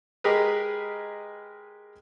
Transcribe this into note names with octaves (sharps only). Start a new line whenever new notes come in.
G#3 G4 G#4 A#4 B4 D#5